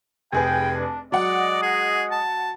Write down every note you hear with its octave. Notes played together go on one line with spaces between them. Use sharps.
F1 G#4 B4 G5 G#5
D4
F#3 G#3 F#4 D5 D#5 F#5
G#4
A5